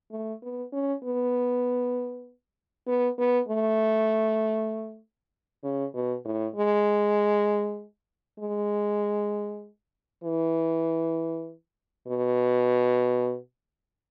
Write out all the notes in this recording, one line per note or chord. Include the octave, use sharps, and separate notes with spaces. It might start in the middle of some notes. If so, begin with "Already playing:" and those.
A3
B3
C#4
B3
B3
B3
A3
C#3
B2
A2
G#3
G#3
E3
B2